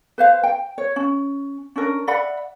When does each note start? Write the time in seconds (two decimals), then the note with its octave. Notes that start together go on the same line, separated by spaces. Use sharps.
0.18 B4 C5 F5
0.43 G5
0.78 C#5
0.96 C#4
1.76 C#4 D4 A#4
2.07 D5 E5 F#5 B5